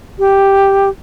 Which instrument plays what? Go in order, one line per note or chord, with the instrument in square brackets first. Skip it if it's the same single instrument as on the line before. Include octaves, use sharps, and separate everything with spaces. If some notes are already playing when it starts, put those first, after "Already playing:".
[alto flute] G4